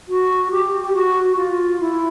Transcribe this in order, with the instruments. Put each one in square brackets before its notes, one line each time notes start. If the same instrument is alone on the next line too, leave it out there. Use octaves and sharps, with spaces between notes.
[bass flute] F#4
G4
G4
F#4
F4
E4